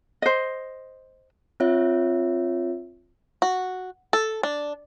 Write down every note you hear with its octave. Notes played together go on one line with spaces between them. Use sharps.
C5 D#5
C4 F4 C#5 E5
F#4
A4
D4